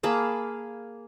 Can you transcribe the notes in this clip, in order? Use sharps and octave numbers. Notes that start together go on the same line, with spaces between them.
A#3 G#4 A5 B5